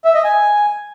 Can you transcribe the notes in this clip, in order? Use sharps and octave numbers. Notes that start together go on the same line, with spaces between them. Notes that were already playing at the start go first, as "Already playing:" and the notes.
E5
D#5
G#5